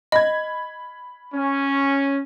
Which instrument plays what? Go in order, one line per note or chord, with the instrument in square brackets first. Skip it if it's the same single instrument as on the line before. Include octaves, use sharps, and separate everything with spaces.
[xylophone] D#5 [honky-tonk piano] B5 G#6
[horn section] C#4